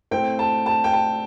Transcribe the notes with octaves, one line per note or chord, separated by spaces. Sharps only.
A2 A3 C4 G5
A5
A5
G5
A5